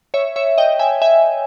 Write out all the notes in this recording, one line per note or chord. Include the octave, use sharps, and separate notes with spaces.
C#5 E5
C#5 E5
D#5 G5
E5 G#5
E5 G#5